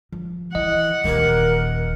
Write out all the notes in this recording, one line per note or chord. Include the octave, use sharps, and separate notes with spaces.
F3
E3 D#5 F#5
D#1 D#2 A#4